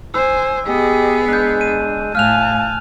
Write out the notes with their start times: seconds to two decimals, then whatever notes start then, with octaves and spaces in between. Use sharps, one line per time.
0.14 C5 G#5 E6
0.67 B3 G4 G#4 D#5
1.28 G#3 D4 F#6 G6
1.61 D#7
2.15 A2 F5 G#5 A5 F6 F#6 F7